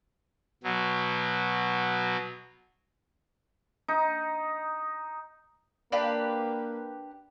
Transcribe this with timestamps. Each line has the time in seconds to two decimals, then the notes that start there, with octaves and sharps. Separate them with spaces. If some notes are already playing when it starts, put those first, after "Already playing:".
0.64 B2 F#3
3.88 D#4
5.92 A#3 D4 G4 B4 D5 F5